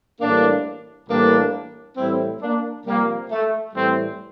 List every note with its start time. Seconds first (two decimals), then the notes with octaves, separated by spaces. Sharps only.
0.20 A2 E3 G3 A#3 D4
1.09 A2 E3 G3 A#3 D4
1.97 A2 E3 G3 C4 E4
2.41 A#3 D4
2.85 C3 F3 G3 A#3
3.30 A3
3.74 A2 E3 G3 A3 C4